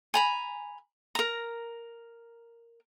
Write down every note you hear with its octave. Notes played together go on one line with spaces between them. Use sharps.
G#5 A#5 B5
A#4 A#5